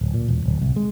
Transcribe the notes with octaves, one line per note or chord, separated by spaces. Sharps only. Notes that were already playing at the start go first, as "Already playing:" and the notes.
D1
A#2
E1
D1
C2
G#3